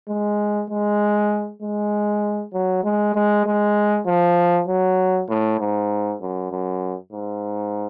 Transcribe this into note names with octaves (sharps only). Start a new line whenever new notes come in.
G#3
G#3
G#3
F#3
G#3
G#3
G#3
F3
F#3
A2
G#2
F#2
F#2
G#2